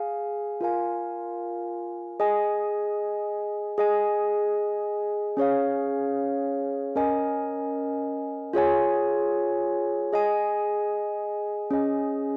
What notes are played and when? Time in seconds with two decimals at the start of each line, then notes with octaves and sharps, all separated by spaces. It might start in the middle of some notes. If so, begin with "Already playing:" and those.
Already playing: G#4 F5 G#5
0.61 F4 A#4 F5 G#5
2.20 G#4 D#5 G#5
3.78 G#4 D#5 G#5
5.37 C#4 G#4 C#5 F5
6.95 C#4 A#4 D#5 G#5
8.53 F4 G#4 C#5 G#5
10.13 G#4 D#5 G#5
11.71 C#4 G#4 D#5 G#5